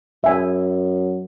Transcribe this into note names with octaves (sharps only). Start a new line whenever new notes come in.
F#2 E5 G#5